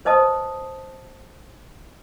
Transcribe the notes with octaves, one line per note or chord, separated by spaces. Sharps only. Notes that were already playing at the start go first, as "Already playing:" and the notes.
B4 C5 D#5 A5 D#6